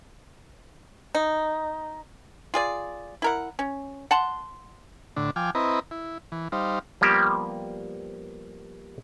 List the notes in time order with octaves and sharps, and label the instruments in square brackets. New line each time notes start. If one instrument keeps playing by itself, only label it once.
[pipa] D#4
F4 G#4 D5
E4 A#4 F#5
C#4
F#5 A5 C6
[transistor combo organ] A2 D3 D4
F3 G5 G#5 D6 F6
C4 E4 B4 D#5 A#5
E4
E3
G3 D#4 C5 F5
[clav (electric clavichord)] F3 G3 A#3 B3 G4